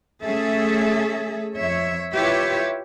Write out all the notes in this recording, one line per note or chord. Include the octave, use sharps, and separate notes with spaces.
A3 C#4 G#4 A4 E5
F2 C#5 E5
E4 F4 G4 B4 C#5 E5